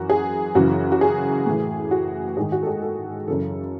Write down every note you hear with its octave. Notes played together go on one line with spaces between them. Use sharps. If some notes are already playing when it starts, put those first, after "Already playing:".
Already playing: F#2 E3 F#4
G#4
F#2 C#3 E3 F#4
F#4
G#4
A2 E3
F#4
G#2 D#3 G#4
F#4
A4
G#4
A4
F#2 C#3 E3 A4